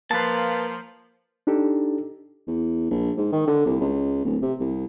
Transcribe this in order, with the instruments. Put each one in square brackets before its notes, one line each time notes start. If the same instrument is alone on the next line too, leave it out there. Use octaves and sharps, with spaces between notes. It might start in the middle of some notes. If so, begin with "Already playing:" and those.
[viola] F3 [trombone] A#3 [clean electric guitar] B4 A5
[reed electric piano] D4 D#4 G4 A4
[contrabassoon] E2
A#1
G#2
D#3
D3
C2
C#2
D1
C3
C2